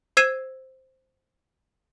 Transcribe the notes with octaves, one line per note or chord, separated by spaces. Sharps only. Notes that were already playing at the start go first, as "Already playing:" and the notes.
C5 E6 G#6 C7 D#7 E7